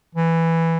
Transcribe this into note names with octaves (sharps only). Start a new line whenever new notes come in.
E3